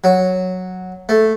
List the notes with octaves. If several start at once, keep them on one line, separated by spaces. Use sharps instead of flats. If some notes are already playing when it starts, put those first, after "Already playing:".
F#3
A3